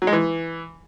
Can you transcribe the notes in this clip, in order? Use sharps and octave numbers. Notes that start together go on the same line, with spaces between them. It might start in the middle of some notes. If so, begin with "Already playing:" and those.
F#3
G#3
E3